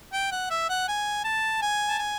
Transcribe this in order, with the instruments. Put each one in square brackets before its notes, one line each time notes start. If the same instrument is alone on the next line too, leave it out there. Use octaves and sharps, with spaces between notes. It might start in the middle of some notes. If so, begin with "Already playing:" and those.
[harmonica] G5
F#5
E5
F#5
G#5
A5
G#5
A5
G#5